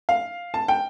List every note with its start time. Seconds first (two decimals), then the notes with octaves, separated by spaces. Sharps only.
0.09 F5
0.54 A5
0.68 G5